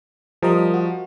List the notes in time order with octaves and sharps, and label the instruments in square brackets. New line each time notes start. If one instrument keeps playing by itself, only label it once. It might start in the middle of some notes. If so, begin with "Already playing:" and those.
[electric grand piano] F3 [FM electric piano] G3 A#4 D#5
[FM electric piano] F#4